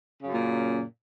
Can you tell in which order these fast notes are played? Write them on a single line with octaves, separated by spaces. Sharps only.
C#3 F#2 A#2